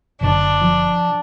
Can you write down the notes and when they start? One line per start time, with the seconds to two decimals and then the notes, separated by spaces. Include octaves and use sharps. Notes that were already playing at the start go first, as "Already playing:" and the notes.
0.21 F#1 D3 D4
0.62 F3